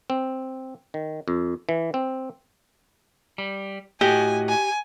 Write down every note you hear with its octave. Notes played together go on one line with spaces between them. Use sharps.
C4
D#3
F2
E3
C4
G3
A2 F#4 G4 D#5 G#5
G#5